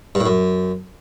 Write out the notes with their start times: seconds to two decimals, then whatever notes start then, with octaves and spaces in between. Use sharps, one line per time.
0.15 G2
0.20 A2
0.26 F#2